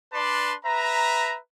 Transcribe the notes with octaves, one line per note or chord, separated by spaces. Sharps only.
D4 B4 D5 A5 C6
B4 E5 A#5